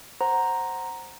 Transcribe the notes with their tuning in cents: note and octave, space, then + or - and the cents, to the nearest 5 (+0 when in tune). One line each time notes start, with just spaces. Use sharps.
C5 +10 F#5 +5 A#5 +0